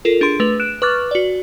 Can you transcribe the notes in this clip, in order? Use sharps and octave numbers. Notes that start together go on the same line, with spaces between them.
F4 A4 A#4
D4 G#4 C6 D7
A3 B4 F7
F#6 D7 E7
B4 C#6 D6 F6 F#6 A6
F#4 D5